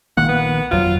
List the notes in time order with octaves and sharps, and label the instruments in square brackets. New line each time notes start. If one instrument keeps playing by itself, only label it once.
[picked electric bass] A#1 D#3 A#3 [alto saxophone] F#5
[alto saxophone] B3
[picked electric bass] G1 F2 F#3 [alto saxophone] F4